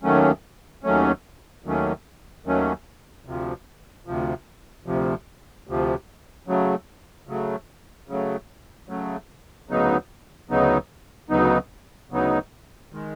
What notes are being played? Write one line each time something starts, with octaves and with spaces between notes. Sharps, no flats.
D#2 D#3 F#3 A3 C#4
D#2 D#3 F#3 A3 C#4
D#2 D#3 F#3 A3 C#4
D#2 D#3 F#3 A3 C#4
D2 C3 F3
D2 C3 F3
D2 C3 F3
D2 C3 F3
C#3 F#3 A3
C#3 F#3 A3
C#3 F#3 A3
C#3 F#3 A3
D2 C#3 F#3 B3 D#4
D2 C#3 F#3 B3 D#4
D2 C#3 F#3 B3 D#4
D2 C#3 F#3 B3 D#4
D#3 G#3